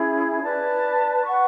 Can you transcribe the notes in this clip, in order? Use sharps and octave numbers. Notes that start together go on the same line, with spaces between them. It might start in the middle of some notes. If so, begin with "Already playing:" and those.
Already playing: C#4 E4 G#4
B4 D5 A5
B4 F#5 C#6